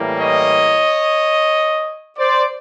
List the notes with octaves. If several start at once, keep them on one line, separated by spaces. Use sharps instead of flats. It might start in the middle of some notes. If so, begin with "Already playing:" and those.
Already playing: A2 E3 G3 A#3
C#5 D#5
C5 D5